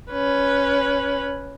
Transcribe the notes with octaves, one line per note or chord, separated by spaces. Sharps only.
C#4 B4